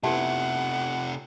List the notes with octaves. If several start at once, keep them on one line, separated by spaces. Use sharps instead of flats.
C3 A3 B3 E4 G4 F#5 A5